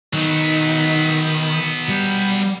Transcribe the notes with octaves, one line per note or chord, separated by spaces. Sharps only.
D#3 F#3 B3
G3